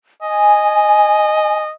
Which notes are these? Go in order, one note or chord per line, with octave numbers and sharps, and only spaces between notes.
D#5 G#5